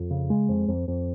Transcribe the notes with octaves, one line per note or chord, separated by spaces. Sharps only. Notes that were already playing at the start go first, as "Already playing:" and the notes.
Already playing: F2
C#3
G#3
F2
F2
F2